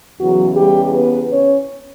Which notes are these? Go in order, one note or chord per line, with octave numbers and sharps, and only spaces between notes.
E2 C#3 E3 F#3 F#4
G3 G4
B3 B4
C#4 C#5